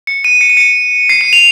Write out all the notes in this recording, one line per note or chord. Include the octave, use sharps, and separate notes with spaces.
C#7
D#7
C#7
D#7
C#7
C7
D#7
F7